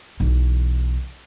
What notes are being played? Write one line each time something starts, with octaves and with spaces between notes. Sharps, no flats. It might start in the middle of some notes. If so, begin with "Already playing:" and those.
B1 E3